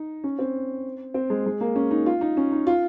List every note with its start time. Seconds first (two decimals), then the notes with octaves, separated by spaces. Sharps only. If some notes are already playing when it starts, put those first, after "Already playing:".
Already playing: D#4
0.24 C#4
0.39 C4
1.14 C4
1.30 G#3
1.46 G#3
1.61 A#3
1.76 C#4
1.91 D#4
2.06 F4
2.21 D#4
2.37 C#4
2.52 D#4
2.67 F4